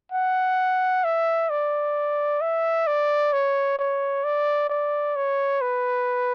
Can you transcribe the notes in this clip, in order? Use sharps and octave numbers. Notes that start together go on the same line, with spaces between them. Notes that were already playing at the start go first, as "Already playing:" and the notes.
F#5
E5
D5
E5
D5
C#5
C#5
D5
D5
C#5
B4